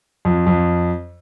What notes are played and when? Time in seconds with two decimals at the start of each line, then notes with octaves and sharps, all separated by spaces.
0.25 F2
0.46 F2